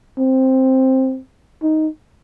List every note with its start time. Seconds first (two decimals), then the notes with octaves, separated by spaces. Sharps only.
0.18 C4
1.62 D#4